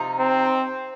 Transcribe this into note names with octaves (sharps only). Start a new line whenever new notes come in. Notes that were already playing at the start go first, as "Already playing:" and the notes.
Already playing: C3 F3 D#4
C4